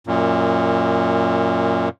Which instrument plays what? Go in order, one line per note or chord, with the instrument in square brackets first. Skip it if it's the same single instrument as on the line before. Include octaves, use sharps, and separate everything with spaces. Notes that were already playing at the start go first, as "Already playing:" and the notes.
[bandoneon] F#2 A#2